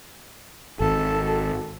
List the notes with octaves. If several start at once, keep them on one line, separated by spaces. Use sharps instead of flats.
G#1 A4